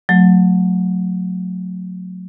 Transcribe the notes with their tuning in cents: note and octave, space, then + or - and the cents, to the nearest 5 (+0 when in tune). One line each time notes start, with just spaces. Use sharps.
F#3 -20 A3 +10